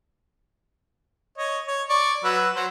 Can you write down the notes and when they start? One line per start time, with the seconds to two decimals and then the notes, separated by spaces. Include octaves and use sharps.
1.38 C#5 D#5
1.67 C#5
1.89 D5 C#6
2.24 F#3 B4 E6
2.56 F#3 C5